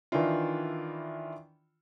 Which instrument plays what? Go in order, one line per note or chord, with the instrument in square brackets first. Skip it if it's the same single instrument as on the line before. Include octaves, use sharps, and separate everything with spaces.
[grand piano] D#3 E3 D4 E4 F4